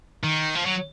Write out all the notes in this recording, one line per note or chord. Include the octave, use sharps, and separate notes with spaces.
D#3
F3
F#3